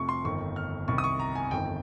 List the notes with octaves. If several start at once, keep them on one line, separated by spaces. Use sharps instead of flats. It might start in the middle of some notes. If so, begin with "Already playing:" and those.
Already playing: F1 F2 C3 F3 C#6
C6
G1 F2 D#3 C#6
F6
C2 C3 D#3 C#6
D#6
C#6
A#5
G#5
G1 F2 D#3 G5